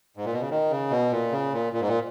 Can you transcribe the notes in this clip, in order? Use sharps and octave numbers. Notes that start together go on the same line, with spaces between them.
G#2
A#2
B2
C#3
D#3
C#3
B2
A#2
C#3
A#2
A#2
G#2
A#2